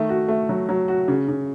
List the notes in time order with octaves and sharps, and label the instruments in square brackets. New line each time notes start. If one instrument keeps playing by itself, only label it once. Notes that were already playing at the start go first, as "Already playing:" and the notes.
Already playing: [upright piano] D#3 A3
F#4
A3
F#3
F#3
F#4
C#3
C#3